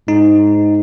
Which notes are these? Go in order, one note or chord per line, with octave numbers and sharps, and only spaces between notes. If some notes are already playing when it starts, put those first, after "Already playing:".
G#2 D#4